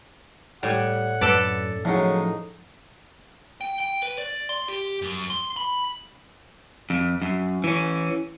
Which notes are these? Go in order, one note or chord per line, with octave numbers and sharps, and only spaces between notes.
A2 G3 F#5
F#2 A4 B4 D5
A2 C#3 F3 F#3 D#4
G5
G5
B4
D5
C6
G4
F#2
C6
B5
F2
F#2
E3 C#4